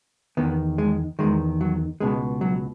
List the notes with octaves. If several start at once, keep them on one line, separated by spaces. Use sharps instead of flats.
E2 D#3 B3
G#3
E2 D#3 G#3
F#3
C#2 B2 G#3
F#3